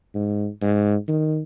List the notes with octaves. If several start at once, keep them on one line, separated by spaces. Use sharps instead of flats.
G#2
G#2
D#3